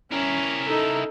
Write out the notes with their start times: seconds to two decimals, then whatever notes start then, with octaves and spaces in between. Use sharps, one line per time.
0.12 C#4 E4 A#4
0.66 D#4 A4